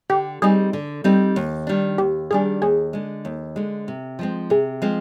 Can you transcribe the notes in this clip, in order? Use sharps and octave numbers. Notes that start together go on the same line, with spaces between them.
D3 G4
G3 C4 D#4 G#4
D3
G3 C4 D#4
D#2
D#3 G3 D4
D#2 G4
D#3 G3 D4 G#4
D#2 G#4
D3 G#3
D#2
D3 G#3
C3
F3 G#3 C4
C3 G#4
F3 G#3 C4